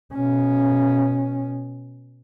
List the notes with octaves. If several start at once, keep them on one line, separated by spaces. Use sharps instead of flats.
B2 C#4